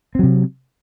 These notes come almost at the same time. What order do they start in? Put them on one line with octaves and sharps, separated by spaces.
C4 F#3 C3